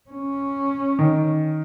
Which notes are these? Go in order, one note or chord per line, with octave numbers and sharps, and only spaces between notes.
C#4
D#3